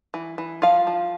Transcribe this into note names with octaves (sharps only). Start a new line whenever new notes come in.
E3
E3
F3 F4 F5
F3